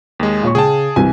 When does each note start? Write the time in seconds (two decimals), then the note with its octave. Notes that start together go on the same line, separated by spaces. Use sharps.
0.19 D#2 G#3
0.43 A#2 C#5 C#6
0.55 C#3 G#4 G5 A5
0.96 C2 E3 G#5